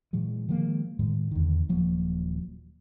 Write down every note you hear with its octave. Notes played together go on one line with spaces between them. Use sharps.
A#2 E3 F#3 G#3
D#3 F3 G#3 A#3
A2 D#3 G#3
E2 D3 D#3
D#1 F3 F#3 A#3